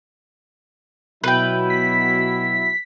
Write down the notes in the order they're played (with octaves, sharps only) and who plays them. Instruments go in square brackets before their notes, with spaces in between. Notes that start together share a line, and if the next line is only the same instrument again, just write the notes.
[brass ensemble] B2 F#3 E4 [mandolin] B4 G5
[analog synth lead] B6